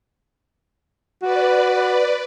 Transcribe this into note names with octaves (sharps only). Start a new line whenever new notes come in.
F#4 B4 D5